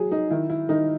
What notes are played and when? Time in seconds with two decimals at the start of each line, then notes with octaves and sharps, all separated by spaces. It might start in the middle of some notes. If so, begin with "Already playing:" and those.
Already playing: F#3 G#4
0.12 D#4
0.31 D#3 E4
0.50 E4
0.69 D#3 D#4